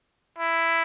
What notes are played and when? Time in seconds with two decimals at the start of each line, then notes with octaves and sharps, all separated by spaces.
0.38 E4